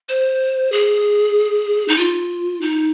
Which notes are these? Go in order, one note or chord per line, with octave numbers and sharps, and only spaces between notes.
C5
G#4
D#4
F4
D#4